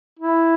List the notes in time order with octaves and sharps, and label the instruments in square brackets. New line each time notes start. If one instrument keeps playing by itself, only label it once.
[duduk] E4